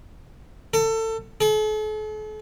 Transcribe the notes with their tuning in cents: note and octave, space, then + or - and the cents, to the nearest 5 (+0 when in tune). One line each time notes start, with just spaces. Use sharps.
A4 +25
A4 -45